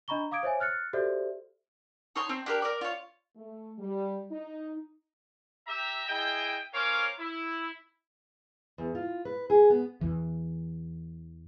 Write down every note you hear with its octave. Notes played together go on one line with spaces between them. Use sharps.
D4 D#5 A#5 B5 C#6 G7
F5 D6 D#6 G#6 D7
C5 C#5 E5 G#5
F6 F#6 A6 C#7
F#4 G4 A4 C5 D5 E5
D#4 C#5 C6
C4
D4 G4 A#4
A#4 D5
F4 C#5
A3
G3
D#4
G4 E5 A#5
E4 G#4 D#5 G5
C#4 A#4 C5 C#5 F5 D6
E4
E2
F4
B4
G#4
B3
E2 E3